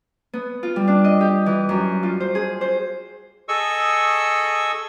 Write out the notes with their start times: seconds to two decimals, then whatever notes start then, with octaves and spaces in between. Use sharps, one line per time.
0.33 B3
0.63 F4
0.76 G3
0.88 D4
1.04 D#5
1.21 G4
1.46 E3
1.69 F#2
2.03 F4
2.20 C5
2.35 G#4
2.61 C5
3.48 G#4 A4 D#5 C#6 E6